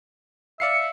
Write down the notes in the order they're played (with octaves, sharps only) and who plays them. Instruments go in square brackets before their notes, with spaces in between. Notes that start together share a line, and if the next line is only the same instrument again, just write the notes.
[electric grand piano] D5 F5 C7 [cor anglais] E5 [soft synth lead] C#7